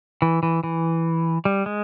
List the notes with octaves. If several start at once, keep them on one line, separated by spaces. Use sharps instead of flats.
E3
E3
E3
G3
G#3